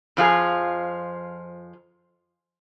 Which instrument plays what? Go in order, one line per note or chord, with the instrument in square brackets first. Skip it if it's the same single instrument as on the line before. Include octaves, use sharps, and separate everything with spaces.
[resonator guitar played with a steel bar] F2 F3 F4 G#4